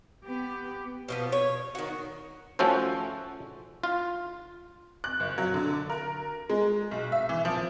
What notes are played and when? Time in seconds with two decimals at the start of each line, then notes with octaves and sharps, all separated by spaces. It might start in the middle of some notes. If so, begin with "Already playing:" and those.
0.25 B3 G4
1.08 B2 F3 B3
1.32 C#5
1.75 D#3 F#4
2.59 F3 A3 C#4 F#4 A4 C5
3.84 F4
5.04 F#6
5.20 F#1
5.38 F#3
5.54 D3
5.89 A#4
6.49 G#3
6.91 B1
7.12 E5
7.29 E3
7.45 F3